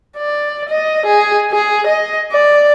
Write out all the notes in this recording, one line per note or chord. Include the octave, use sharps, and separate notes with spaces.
D5
D#5
G#4
G#4
D#5
D5